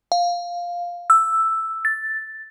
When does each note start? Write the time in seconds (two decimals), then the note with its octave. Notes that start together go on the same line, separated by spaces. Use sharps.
0.12 F5
1.10 E6
1.85 A6